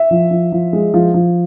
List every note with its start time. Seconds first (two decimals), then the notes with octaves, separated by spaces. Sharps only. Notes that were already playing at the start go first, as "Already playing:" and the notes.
Already playing: E5
0.11 F3
0.31 F3
0.52 F3
0.73 G#3
0.94 F3
1.14 F3